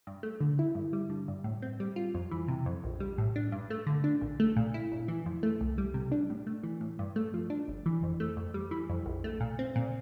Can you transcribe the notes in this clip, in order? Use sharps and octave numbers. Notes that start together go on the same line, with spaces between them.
G2
A3
D3
E4
G2
G3
D3
G2
A2
C4
G3
F4
F2
E3
C3
F2
A#1
G3
A2
D4
G2
A3
D3
D4
A#1
A3
A#2
E4
G1
E3
F2
A3
C2
G3
C3
D4
A2
A3
E3
A2
G2
A3
F3
D4
G1
E3
F2
A3
F2
G3
E3
F2
A#1
A3
A#2
C4
A#2